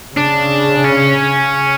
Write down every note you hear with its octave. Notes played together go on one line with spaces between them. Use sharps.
C#3 D4
C#4